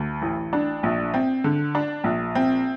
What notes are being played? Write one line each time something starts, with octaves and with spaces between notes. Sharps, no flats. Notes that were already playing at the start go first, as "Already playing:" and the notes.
Already playing: D2
A1
D4
A#1
C4
D3
D4
A#1
C4